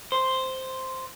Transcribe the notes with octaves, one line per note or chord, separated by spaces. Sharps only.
C5